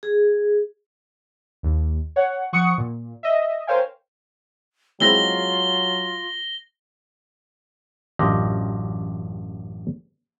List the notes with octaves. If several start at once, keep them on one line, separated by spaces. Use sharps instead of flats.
G#4
D#2
C#5 F#5
F3 F#5 C#6 D#6 C#7
A#2
D#5 E5
A#4 C5 C#5 F5 G5 G#5
F#3 G#3 C4 E4 F4 A#6 G7
A1 F#2 D4 F4 G4 D#5